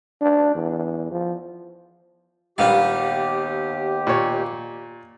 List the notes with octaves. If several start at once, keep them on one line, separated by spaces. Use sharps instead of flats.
D4
E2
F3
A#1 D#2 G3 B3 G4 F5
A#2 C#5